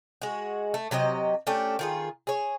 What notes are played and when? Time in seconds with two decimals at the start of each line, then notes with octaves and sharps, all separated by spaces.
0.22 G#3 F#4
0.74 A3
0.91 C3 F#3 G4 D#5
1.47 A3 C#4 D4 G4
1.79 D#3 F4 G#4
2.27 G#4 C#5